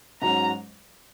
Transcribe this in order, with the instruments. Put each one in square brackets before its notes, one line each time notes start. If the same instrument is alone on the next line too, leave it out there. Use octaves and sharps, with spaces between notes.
[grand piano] G#2 F#3 C#4 [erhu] A#5